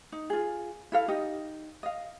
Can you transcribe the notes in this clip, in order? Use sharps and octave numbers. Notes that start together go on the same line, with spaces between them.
D#4
F4 G#4
E4 A4 F5
D#4 G4 D#5
D#5 F5